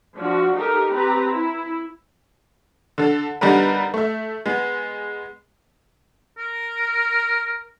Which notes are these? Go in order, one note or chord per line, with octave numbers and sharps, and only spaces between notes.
F3 D4 F#4
D#4 G4 A4 A#4
C4 G4 B4 A#5
E4
D3 A4
D3 G3 B3 D#4 A#4 B4
A3 E5
G#3 B3
A#4